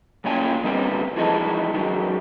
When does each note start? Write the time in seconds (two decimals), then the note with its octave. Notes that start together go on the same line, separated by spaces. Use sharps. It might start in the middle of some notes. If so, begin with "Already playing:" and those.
0.24 B1 A#2 C#4 F4 G5 G#5
0.64 D3 D#3 G3 G#3 B3 C4
1.16 E3 F3 G#3 D#4 A4
1.74 D#3 F#3 G#3